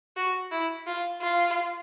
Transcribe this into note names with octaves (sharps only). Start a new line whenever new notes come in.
F#4
E4
F4
F4